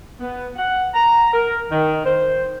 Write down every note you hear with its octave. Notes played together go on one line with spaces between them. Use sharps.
B3
F#5
A#5
A#4
D#3
C5